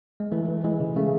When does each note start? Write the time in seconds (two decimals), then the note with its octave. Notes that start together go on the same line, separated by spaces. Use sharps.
0.20 G#3
0.32 E3 A3
0.48 E3
0.64 E3 G#3
0.80 C#3
0.96 C#3 A3